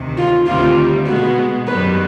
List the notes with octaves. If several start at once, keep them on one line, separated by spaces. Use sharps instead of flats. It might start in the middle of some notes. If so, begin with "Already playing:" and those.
Already playing: D2 C3 D#3
F4
D2 C3 D#3 G3 F4
B2 G#3 B3 F#4
F#2 D#3 G3 B3 B4